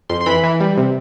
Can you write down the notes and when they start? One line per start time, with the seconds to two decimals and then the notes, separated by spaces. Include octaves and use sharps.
0.09 F2 C6
0.21 C6
0.26 E3 B5
0.44 E3
0.60 G3
0.77 C3